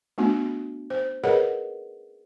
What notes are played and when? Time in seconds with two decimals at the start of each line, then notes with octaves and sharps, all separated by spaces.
0.18 A3 B3 D4 F#4
0.90 C5
1.24 G#4 A#4 B4 C#5 D#5 F#5